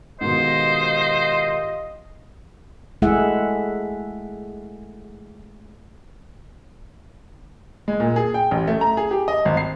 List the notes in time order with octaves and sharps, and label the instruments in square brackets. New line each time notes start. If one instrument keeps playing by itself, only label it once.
[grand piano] G#2 B2 D#3 [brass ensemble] F4 G4 D#5 [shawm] C5
[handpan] G#3 A3 E4 G#4 E5 F#5
[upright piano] G#3
A#2
G#4
G5
A1
A3
A#5
G#4
G4
D#5
G#1
C7